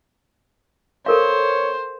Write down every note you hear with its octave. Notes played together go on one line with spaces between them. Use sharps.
A4 A#4 C5 C#5 F5